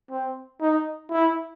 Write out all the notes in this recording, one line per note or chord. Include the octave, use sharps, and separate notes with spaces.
C4
D#4
E4